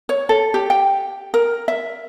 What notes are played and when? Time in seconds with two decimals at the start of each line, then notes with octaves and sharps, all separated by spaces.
0.09 C#5
0.29 A4
0.54 G4
0.70 G5
1.34 A#4
1.68 E5